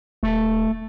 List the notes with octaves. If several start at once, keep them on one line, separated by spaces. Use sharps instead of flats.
D#1 A3